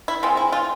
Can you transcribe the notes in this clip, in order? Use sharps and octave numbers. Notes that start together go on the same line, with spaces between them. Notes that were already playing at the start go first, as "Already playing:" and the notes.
E4
E3 G#3 C4 F4
E4
F4